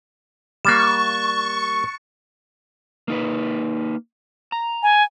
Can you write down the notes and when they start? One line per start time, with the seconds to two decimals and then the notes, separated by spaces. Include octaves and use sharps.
0.65 G3 A#3 C#6 F#6 A6 E7
3.08 A#3 D#4 B4
4.52 A#5
4.83 G#5